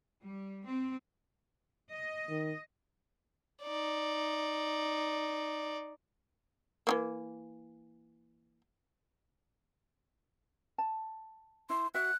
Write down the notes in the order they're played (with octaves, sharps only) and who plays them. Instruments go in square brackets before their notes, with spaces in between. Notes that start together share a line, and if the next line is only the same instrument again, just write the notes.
[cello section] G3
C4
D#5
[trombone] D#3
[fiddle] D#4 D5
[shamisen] E3 F3 A#3
[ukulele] A5
[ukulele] E4 [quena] C6
[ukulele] F#4 E5 [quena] F#6